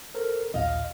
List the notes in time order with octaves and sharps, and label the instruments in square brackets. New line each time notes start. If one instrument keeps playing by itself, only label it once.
[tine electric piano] A4 A#4 C5
[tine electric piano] A#1 D#2 A#2 [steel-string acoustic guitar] D#5 F5